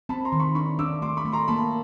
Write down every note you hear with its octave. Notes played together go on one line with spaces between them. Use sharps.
C4 A5 B5
A#5 C6
D#3
B5 C#6
D4 B5 C#6
D4 D6 E6
A3 C6 D6
B5 C#6
A3
A#5 C6
A#3 A5 B5